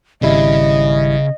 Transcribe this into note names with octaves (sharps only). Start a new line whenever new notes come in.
G#1 C#3 G3 E4 D#5